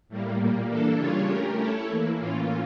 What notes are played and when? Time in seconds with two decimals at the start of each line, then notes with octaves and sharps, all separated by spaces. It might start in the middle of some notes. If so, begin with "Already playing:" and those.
0.09 A2 G3 A#3
0.39 A#2 G3 A#3
0.68 E3 A#3 D4 A4
0.98 C#3 G3 D4 F4 C#5
1.28 A3 C#4 G4 A#4
1.58 A3 E4 A4 C#5
1.88 E3 A#3 E4
2.18 A2 E3 A#3 C#4 F4